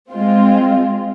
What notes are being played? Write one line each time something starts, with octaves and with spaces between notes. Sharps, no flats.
G#3 C4 F4